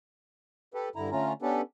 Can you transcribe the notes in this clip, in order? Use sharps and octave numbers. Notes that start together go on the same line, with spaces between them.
G4 A4 B4
G2 D3 E4 A#5
D3 A3 C#4 F4 A#5
B3 C#4 D4 G4 A4 B4